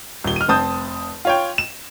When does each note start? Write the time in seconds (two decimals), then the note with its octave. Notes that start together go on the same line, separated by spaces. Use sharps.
0.24 D#1 G7
0.36 F6 D#7
0.48 F1 C4 A5 D#6 G6
1.25 F4 C#5 G5
1.58 E7